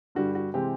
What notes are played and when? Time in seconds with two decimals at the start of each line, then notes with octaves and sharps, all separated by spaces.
0.15 G2 D3 G3 F#4
0.35 F#4
0.54 C3 E3 G#3 C4 G4